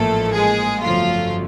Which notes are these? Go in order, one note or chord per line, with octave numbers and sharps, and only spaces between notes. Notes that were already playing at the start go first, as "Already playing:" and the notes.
Already playing: A1 G#2 F3 A3 A#3 A4
G#3 G#4
G1 F2 C#3 F3 F#3 A3 F4